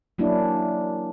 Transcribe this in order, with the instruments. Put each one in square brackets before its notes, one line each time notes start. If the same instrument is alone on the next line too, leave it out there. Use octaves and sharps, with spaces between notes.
[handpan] F#3 A#3 C#4 D4 E4